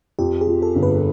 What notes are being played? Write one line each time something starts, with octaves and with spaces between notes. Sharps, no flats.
F2 G4
G#4
F3
A4
G1
B4